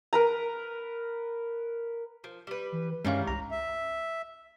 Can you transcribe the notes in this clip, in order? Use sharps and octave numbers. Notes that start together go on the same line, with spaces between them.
A#4 B4 A#5
F3
G3 B4
E3
G2 D#3 E3 G3 G#3 C#4 F5
C2 A#5
E5